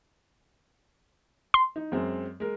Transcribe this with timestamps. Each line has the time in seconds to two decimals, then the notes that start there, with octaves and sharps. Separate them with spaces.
1.54 C6
1.76 D#4
1.92 F#2 G#3 C4
2.40 G#3 A#4